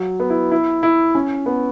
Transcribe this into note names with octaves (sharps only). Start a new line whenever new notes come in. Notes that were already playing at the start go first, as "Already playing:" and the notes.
Already playing: F#3
B3
E4
E4
E4
C#4
B3